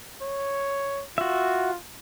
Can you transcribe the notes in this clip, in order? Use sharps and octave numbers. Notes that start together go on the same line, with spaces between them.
C#5
F4 F#4 E5